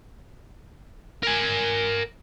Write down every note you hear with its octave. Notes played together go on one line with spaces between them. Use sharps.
A#4 G#5